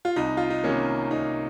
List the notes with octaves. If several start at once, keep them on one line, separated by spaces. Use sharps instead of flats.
F4
C2 D#4
F4
D#4
C3 D#3 A#3 C#4
C2 D#4